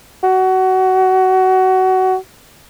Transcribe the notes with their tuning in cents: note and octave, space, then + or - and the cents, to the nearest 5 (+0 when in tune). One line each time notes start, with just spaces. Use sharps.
F#4 +20